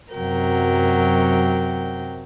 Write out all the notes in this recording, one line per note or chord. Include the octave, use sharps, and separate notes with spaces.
F#2 C3 F#3 A#4 G5